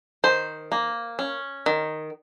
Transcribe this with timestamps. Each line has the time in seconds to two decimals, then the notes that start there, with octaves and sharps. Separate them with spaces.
0.24 D#3 C5
0.72 A#3
1.19 C#4
1.66 D#3